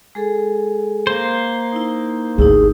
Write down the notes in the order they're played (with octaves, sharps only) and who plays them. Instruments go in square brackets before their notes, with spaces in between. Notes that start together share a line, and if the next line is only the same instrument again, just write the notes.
[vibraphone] G#3 G#4 A4
[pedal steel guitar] A#3 C5
[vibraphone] D#4 E4
[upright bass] G#1 D2 [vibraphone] D#4 E4 G4 [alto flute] G#4